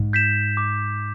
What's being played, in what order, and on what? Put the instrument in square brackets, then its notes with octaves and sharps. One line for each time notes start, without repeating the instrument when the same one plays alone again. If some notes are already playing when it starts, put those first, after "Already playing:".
Already playing: [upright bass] G#2
[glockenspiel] G6 B6 E7
D6